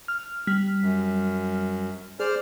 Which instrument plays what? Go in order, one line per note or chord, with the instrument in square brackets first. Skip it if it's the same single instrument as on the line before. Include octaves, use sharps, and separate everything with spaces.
[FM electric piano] F6
G3 F6 B6
[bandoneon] F#2
[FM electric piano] G#4 [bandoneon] C5 D5 F6